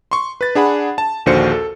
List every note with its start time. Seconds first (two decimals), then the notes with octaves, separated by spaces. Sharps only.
0.11 C6 C#6
0.41 B4 A6
0.55 D4 G#4 F#5 B5
0.98 A5
1.26 A#1 D#2 D3 F#4 C5 C#7
1.52 A4